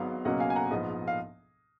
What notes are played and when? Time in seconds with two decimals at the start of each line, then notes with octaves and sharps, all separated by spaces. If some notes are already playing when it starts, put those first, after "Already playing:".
Already playing: G#1 G#2 F#3 B3 F5
0.25 C#2 B2 F#3 A#3 C#4 D#5 F#5
0.40 F5 G#5
0.50 G#5
0.56 F#5 A#5
0.71 A#1 G#2 F3 B3 D#5
1.08 F5